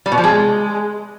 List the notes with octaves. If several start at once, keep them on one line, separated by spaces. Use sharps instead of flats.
G3
B2
F3
G#3